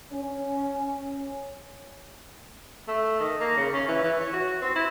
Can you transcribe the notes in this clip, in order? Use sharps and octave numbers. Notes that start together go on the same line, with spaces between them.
C#4
A3
D#3
A#3
C#3
C#4
E3
E3
C#5
F#4
C4
E4